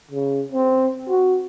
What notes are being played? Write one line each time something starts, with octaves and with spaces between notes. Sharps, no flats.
C#3
C4
F#4